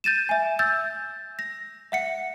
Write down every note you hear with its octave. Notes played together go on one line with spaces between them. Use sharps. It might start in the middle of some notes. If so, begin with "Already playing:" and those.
G6 A6 D#7 E7
E5 G#5
E6 G6 A6
A#6
E5 F#5 C#7